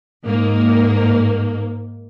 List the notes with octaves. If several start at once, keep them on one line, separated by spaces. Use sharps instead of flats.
G#2 A#3